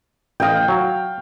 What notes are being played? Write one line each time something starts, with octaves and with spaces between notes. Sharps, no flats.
A1 D#5 F5 G5
F#3